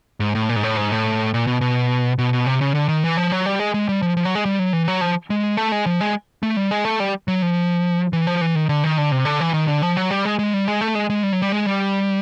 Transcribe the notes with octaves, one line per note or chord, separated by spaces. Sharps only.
G#2
A2
A#2
G#2
A2
G#2
A2
A#2
B2
B2
B2
B2
C3
C#3
D3
D#3
E3
F3
F#3
G3
G#3
G#3
G3
F3
F3
F#3
G#3
G3
F#3
E3
F#3
F3
G#3
A3
G#3
F3
G#3
A3
G3
G#3
A3
G3
F#3
F3
E3
F3
E3
D#3
D3
D#3
D3
C3
D3
E3
D#3
D3
F3
F#3
G3
G#3
G#3
G3
G#3
A3
G#3
G#3
G3
F#3
G3
G#3
G3